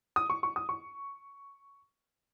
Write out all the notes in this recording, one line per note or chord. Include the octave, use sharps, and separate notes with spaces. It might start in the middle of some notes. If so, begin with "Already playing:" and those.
D#6
C#6
C#6
D#6
C#6